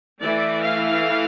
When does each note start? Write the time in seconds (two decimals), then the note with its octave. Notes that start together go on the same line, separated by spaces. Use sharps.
0.21 E3 A3 E4 D5
0.61 F5